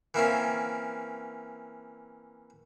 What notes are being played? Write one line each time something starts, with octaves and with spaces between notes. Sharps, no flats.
E3 A#3 C4 C#4